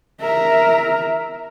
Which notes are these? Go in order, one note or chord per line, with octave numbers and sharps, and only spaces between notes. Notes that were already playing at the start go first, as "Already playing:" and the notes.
A#4 E5